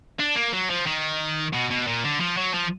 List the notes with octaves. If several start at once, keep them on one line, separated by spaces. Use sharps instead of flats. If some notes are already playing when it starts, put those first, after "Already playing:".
D4
A#3
F#3
F3
D#3
B2
B2
A#2
D3
F3
F#3
F3